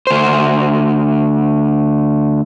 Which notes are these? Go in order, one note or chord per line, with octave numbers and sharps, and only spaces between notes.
D2 C5